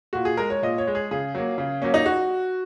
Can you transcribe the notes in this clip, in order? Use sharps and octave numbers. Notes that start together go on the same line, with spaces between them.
A#2 F#4
G#4
G#3 A#4
C#5
A#2 D#5
C#5
G#3
G#4
C#3 G#4
F#3 A#3
C#3
F#3 A#3 C#4
D#4
F#4